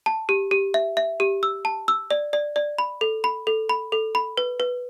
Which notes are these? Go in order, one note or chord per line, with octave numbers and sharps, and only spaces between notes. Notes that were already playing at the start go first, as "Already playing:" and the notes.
A5
G4
G4
E5
E5
G4
E6
A5
E6
D5
D5
D5
B5
A4
B5
A4
B5
A4
B5
B4
B4